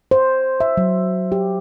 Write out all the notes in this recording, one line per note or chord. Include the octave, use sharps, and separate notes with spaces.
C5
E5
F#3
G4